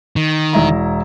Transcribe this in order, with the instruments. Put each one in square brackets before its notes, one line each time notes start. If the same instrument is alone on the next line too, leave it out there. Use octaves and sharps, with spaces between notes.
[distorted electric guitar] D#3
[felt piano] E1 E4 A#5